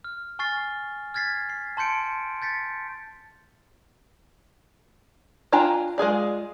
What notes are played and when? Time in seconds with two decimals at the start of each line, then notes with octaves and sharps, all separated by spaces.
0.04 F6
0.39 G#5 C#6 F6 A6 C7
1.14 F6 G#6 A6 B6 C7
1.49 C7
1.77 A5 C6 G6 C#7 D7
2.42 G6 A6 B6 C#7
5.52 D4 F4 G5 G#5 A#5
5.98 G#3 F4 G#4 D5